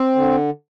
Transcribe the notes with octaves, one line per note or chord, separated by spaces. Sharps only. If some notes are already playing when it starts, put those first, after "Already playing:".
Already playing: C4
D3